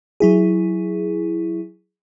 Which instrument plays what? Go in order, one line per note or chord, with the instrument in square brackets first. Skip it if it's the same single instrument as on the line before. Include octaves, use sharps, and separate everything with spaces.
[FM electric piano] F#3 E4 G#4